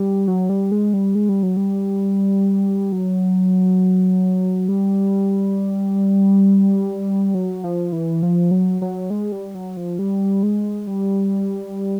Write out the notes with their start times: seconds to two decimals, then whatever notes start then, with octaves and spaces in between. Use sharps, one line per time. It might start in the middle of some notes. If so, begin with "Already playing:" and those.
Already playing: G3
0.27 F#3
0.49 G3
0.72 G#3
0.94 G3
1.15 G#3
1.29 G3
1.43 F#3
1.57 G3
2.92 F#3
4.69 G3
7.35 F#3
7.64 F3
7.92 E3
8.23 F3
8.51 F#3
8.82 F#3
9.10 G#3
9.32 G3
9.55 F#3
9.77 F3
9.99 G3
10.43 G#3
10.87 G3